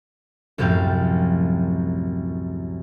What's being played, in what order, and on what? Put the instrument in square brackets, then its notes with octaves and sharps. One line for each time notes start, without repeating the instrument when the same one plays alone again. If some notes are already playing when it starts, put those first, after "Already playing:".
[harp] C2 F#2 A2 F3 F5 G5